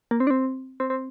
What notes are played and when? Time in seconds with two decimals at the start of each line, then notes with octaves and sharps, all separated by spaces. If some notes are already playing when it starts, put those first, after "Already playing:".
0.11 A#3
0.20 C4
0.27 D4
0.30 C4
0.80 C4
0.90 C4